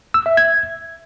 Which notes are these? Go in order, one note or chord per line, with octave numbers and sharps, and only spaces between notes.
E6
E5
G#6